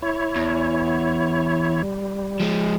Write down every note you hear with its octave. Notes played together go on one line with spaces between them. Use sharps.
E4 C#5
E2
G3
F3 G#3